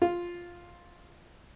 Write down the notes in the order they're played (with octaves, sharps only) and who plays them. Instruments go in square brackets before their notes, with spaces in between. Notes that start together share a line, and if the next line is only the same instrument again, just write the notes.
[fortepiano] F4